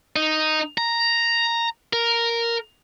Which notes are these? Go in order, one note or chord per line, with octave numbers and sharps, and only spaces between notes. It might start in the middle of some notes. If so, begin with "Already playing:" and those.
D#4
A#5
A#4